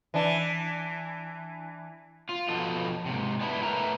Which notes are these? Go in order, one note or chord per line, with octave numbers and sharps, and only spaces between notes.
E3 D4
F4
B2 F3 F#4 A4 D#5
G#2 C3
B3 D4 E4
A2 A#4 B4 E5 A#5